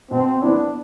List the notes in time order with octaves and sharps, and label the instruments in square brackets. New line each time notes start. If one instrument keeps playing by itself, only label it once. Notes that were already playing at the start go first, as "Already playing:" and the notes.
[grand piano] B2 [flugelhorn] C4
[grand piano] B3 E4 [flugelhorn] D4